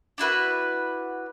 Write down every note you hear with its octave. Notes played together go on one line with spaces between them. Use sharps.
D4 E4 F#4 B4